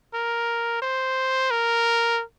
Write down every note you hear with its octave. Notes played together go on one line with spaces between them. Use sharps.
A#4
C5
A#4